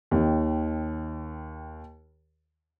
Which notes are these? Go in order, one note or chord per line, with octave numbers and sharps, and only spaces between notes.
D#2 D#3